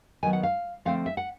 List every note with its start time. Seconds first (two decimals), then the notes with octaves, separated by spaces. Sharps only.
0.23 D#3 F#3 B3 G#5
0.33 F#5
0.43 F5
0.85 D3 F3 A3 C4 F5
1.06 E5
1.17 F#5